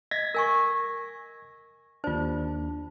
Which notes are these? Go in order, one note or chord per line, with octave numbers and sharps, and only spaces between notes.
D#5 G#6 A#6 B6
A#4 G#5 C#6
D#2 D4 F4 C5